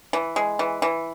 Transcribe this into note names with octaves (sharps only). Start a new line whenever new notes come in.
E3
G#3
E3
E3